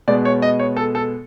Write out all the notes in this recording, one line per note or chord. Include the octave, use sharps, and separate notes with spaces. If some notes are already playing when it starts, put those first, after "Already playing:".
B2 G#3 B3 D5
C#5
D#5
C#5
A4
A4